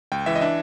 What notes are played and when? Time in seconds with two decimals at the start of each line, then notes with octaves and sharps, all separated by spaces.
0.12 C#2 G5
0.26 E3 E5
0.35 D#5
0.41 D4 E5